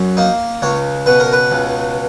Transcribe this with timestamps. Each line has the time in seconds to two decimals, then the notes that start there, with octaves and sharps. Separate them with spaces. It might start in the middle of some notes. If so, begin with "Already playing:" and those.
Already playing: F#2
0.17 A#3 D#4
0.62 C#2 C#5
1.06 B2 B4
1.20 A#4
1.33 B4
1.52 C#2